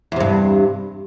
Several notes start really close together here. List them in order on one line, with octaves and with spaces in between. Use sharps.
E2 C3 G2